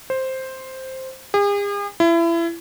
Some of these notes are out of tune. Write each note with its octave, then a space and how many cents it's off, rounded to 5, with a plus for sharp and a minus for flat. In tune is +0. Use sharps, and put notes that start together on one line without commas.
C5 +5
G#4 -45
E4 +30